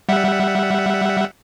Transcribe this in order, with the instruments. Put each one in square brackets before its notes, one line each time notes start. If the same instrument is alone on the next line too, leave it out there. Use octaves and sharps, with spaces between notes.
[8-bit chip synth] G3 E5 F#5